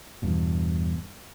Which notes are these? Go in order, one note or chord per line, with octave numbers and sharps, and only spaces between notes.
E2 G2 B2